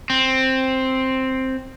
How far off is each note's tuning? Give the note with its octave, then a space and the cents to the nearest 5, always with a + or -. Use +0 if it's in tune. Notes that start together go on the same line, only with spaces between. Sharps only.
C4 +5